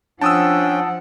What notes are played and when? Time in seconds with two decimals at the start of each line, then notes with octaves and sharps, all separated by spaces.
0.21 F3 C#4 D4 F#5 G5 A5 D#6 E6